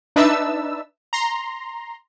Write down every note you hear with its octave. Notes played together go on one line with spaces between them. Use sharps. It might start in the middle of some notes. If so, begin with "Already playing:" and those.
D4 D#4 B4 E5 A5 E6
A#5 C6